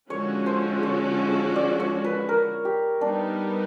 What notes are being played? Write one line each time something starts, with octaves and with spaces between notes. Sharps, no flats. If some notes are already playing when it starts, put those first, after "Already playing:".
D3 F3 G#3 C#4 F#4 C#5
C5
C#5
D5
C#5
B4
A#4
G4
G3 B3 D4 D#4